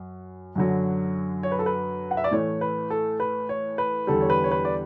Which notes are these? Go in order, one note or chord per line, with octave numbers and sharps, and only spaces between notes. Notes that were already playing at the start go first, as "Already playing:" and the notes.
Already playing: F#2
F#2 D3 F#3
C#5
B4
A4
B4
F#5
E5
D5
A2 E3 A3 C#5
B4
A4
B4
C#5
B4
E2 D3 G3 A4
C#5
B4
C#5
B4
D5